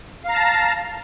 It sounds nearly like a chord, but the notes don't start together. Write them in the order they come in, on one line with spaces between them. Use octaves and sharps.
F5 A#5 A5